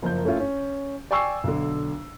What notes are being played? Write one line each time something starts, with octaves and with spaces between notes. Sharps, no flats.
F#1 F3 A#4 G6
A3 C#4 E4 F4
C#4
D5 G5 G#5 C#6 E6 C7
B1 D3